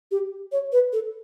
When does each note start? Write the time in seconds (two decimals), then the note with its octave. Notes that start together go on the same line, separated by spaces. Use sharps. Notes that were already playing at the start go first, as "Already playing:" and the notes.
0.11 G4
0.52 C#5
0.72 B4
0.93 A4